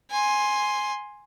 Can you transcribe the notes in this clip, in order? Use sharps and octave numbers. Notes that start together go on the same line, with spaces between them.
G#5 C6